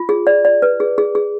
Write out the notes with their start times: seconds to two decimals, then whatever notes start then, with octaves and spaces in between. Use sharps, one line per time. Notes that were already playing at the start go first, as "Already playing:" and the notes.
Already playing: F4
0.09 G#4
0.27 D5
0.45 D5
0.62 B4
0.80 G#4
0.98 G#4
1.15 G#4